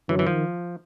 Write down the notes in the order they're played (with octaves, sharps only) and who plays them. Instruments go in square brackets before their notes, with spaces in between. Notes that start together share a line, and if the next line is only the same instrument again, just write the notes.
[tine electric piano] F#2 D3 F#3 [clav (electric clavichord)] E3
[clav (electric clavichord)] E3
[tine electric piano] D#3 [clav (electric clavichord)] F3